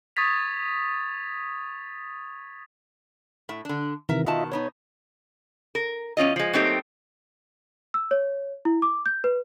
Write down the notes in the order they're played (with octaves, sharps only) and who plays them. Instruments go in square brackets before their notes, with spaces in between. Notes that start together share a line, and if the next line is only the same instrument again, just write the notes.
[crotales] C#6 D#6 G#6 A6 B6 F7
[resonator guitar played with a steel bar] A2 E5
D3 D4
[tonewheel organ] C3 D#3 E3 [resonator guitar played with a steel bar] A#4 E5
[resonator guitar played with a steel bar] B2 D#3 A5 [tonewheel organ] F4 D#5 E5
[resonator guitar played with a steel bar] B2 B3 D#4 [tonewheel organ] C#5
[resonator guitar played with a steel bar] A#4
E2 C#4 F4 D#5
F3 G#3
F#3 A3 A#3 C4 D#4 G4
[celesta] E6
C#5
E4
D6
G6
B4